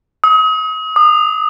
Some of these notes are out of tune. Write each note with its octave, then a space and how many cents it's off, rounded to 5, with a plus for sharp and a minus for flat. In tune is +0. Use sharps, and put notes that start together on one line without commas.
D#6 +35
D#6 -35